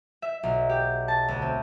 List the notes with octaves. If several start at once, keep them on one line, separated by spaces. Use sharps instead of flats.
E5
B1
G4
A5
D2
C4